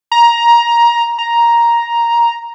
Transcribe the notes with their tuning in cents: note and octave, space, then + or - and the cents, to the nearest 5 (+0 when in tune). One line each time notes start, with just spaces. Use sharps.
A#5 +15
A#5 +5